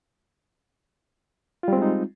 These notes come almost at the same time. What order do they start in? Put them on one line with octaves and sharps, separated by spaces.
F4 G3 C4 G#3 D#4